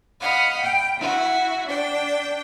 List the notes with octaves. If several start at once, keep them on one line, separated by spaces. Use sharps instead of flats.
D#5 F5 F#5 B5
G5
E4 F#4
D4 G5